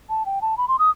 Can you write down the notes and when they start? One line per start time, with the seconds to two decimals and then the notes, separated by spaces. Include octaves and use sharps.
0.10 A5
0.26 G5
0.42 A5
0.57 B5
0.68 C6
0.79 D#6